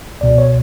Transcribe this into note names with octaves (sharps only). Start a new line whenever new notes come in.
C#2 B2 D5
C#5